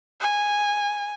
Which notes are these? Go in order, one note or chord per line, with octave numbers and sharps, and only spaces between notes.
G#5